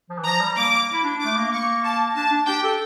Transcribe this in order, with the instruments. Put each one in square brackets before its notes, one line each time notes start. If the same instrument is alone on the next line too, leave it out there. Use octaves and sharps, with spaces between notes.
[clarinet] F3
E3
[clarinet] F3 [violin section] A#5
[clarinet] G3
[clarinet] A#3 [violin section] D6
[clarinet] E4
D4
[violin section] D6
[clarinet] A3
A#3
[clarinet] A#3 [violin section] C#6
[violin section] A5
[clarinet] D4 [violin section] A5
[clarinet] D4
[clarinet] G4 [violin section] G5
[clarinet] A4